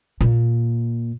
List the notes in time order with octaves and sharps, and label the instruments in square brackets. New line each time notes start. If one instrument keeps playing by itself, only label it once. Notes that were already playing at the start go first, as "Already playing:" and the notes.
[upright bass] A#2